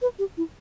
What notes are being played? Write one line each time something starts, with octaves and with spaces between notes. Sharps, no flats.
B4
G4
E4